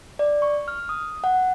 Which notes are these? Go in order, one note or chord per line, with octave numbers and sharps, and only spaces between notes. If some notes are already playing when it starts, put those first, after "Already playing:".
D5
C#6
F6
D#6
F#5